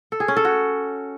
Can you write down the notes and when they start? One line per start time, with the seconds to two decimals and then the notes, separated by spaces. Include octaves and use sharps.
0.12 A4
0.20 G#4
0.28 C#4
0.37 A4
0.45 F#4